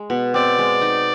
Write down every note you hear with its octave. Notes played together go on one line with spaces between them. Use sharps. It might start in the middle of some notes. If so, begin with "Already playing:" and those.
Already playing: G#3
B2
C4 D5
G#3
D#4